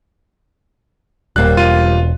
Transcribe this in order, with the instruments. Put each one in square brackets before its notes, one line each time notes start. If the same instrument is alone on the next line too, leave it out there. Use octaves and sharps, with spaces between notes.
[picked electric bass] D#1 [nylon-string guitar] G3 A#3 C4 [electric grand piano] F#6
[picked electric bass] E1 [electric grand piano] F4 D#7